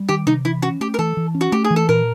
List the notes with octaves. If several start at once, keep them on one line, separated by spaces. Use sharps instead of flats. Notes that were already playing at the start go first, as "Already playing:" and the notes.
Already playing: G3
D#3 G4
C3 D#4
E3 E4
C#4 F#4
A3 G4
A#4
E3 A4
E3
C#4
F#4
A3 G4
G#4
E3
A4
A#2 A#4